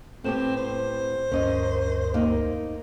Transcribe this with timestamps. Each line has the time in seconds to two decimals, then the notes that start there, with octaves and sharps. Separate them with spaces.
0.24 A2 B3 C4 G4
0.57 C5
1.31 D2 G2 C#4 A#4 D#5
2.14 A#3 D#4